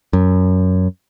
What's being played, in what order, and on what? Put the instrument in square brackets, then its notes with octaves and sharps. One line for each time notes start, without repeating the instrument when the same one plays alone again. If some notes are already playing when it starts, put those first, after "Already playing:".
[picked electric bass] F#2